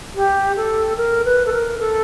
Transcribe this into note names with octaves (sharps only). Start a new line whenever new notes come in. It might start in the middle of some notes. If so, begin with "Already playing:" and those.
G4
A4
A#4
B4
A4
A#4
A4